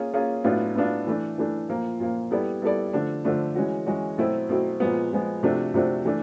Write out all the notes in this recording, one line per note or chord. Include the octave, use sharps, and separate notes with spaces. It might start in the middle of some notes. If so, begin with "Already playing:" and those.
Already playing: A#3 C#4 F4 G#4
A#3 C#4 F4 G#4
A2 F#3 B3 D4 F4
A2 F#3 B3 D4 F4
E3 A3 D4
E3 A3 D4
A#2 F3 A#3
A#2 F3 A#3
G3 B3 E4 A4 D5
G3 B3 E4 A4 D5
D3 F3 A3 D4
D3 F3 A3 D4
E3 G#3 C#4 F#4
E3 G#3 C#4 F#4
B2 F#3 A3 C4 E4
B2 F#3 A3 C4 E4
A#2 F3 G#3 B3
A#2 F3 G#3 B3
C3 F3 A3 D4 F#4
C3 F3 A3 D4 F#4
E3 A3 D4